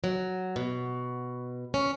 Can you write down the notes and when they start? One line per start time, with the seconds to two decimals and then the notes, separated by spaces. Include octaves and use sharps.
0.04 F#3
0.56 B2
1.74 C#4